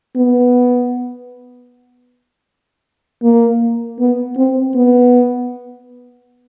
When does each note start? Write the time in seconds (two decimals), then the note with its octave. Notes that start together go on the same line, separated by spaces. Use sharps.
0.16 B3
3.23 A#3
4.00 B3
4.37 C4
4.75 B3